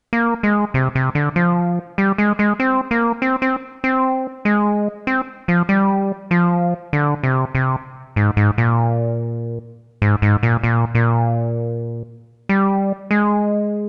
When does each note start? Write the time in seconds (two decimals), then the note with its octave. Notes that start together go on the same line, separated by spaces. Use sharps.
0.13 A#3
0.43 G#3
0.74 C3
0.95 C3
1.15 D3
1.36 F3
1.98 G3
2.18 G#3
2.39 G#3
2.60 C4
2.91 A#3
3.22 C4
3.42 C4
3.84 C4
4.45 G#3
5.07 C4
5.48 F3
5.69 G3
6.31 F3
6.93 D3
7.23 C3
7.55 C3
8.16 G#2
8.37 G#2
8.58 A#2
10.02 G#2
10.22 G#2
10.43 A#2
10.63 A#2
10.95 A#2
12.49 G3
13.11 G#3